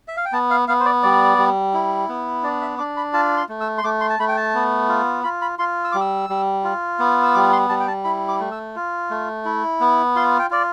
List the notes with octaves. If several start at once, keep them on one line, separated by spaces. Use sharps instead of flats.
E5
F5
G5
B3 A5
F5
B3 F5
C5
D5
G3 D5
G3
E4
B3
D4 D5
E5
D4 D6
B5
F4 A5
C6
A3
E6
C6
A3 D6
C6
A5
A3 B5
G5
A5
B3
F4
F4 B5
B5
F4 C6
E6
G3 D6
E6
G3
F4
B3
E6
G3 D6
C6
G3 A5
G5
A5
E4 B5
D6
A3
E6
F4
A3
E4
B3
F4 C6
G5
F4 D5